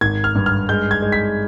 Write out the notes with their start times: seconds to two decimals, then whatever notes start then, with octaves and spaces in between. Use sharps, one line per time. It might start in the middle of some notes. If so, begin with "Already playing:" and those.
0.01 G#1 G#6
0.24 F6
0.35 G2
0.46 F6
0.69 G#3 G6
0.91 G#6
1.02 G#3
1.12 B6